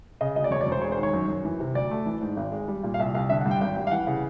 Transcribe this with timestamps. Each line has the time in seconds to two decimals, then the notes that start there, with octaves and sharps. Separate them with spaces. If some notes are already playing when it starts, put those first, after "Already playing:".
0.21 C#3 D#5
0.36 D2 D#5
0.44 D5
0.51 E1 C#5
0.61 D5
0.66 E1
0.72 C5
0.81 G#3 C#5
0.92 C5
0.98 D#3
1.03 C#5
1.13 F#2
1.28 F#2
1.45 E3
1.60 C3
1.74 D2 D5
1.91 A3
2.06 E3
2.22 G#2
2.37 G#1
2.52 G#3
2.68 G3
2.83 A#2
2.94 F5
2.99 C2 E5
3.15 C2 F5
3.29 D3 E5
3.41 F#5
3.46 G2
3.51 G5
3.61 G#1 G5
3.76 G3 G5
3.87 F5
3.91 E3 F#5
4.07 C#3